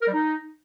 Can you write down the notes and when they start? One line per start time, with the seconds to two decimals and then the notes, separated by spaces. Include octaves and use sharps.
0.02 A#4
0.08 G3
0.13 D#4